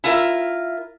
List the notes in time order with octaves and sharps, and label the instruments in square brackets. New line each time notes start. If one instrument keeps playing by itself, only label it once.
[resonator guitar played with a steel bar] E4 F4 A#4 E5